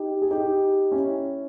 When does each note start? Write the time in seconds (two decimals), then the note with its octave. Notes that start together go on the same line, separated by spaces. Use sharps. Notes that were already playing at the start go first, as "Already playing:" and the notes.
Already playing: D#4 G4
0.22 G#4
0.31 D#4 G4
0.92 C#4 E4